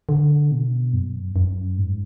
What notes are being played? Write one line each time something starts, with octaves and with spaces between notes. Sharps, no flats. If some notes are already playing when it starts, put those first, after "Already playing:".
D3
B2
F#2
F#2
G#2